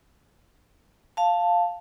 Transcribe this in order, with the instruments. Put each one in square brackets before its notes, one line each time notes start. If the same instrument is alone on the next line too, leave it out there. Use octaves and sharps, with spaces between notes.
[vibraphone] F5 A5